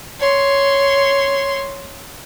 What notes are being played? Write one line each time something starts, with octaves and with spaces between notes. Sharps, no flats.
C#5 C6